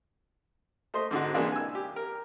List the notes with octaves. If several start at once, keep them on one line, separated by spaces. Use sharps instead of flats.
A3 C5 D#5 C6
G#2 D3 D#4 F#4
C3 E3 G#3 A#3 D4
G#5 E6
G4
A#4